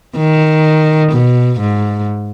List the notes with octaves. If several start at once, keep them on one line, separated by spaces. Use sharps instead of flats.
D#3
B2
G#2